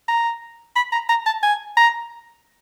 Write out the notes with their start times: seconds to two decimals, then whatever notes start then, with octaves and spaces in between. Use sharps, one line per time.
0.08 A#5
0.76 B5
0.93 A#5
1.09 A#5
1.26 A5
1.43 G#5
1.77 A#5